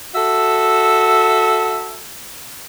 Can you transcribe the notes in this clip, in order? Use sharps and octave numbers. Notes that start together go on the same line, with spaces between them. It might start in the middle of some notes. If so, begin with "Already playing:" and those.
F#4 A4 E5